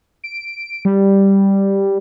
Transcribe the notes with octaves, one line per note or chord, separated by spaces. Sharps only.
D7
G3